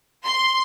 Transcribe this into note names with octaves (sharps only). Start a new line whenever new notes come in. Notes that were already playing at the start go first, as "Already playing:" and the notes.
C6